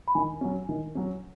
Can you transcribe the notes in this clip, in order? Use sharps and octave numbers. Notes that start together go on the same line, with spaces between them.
B5
D#3 G#5
F#3 C#4
D#3
F#3 C#4